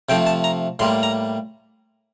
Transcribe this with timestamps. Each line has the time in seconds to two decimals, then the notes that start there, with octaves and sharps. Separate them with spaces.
0.09 C3 F3 A3 G5
0.27 A5
0.44 A#5
0.79 A2 G3 A#3 C6
1.03 A#5